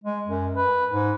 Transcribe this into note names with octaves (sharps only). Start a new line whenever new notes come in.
G#3
F#2
B4
G#2